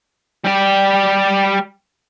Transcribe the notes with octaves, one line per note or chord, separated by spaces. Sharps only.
G3 G4